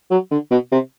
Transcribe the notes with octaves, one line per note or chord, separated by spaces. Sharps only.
F#3
D3
B2
C3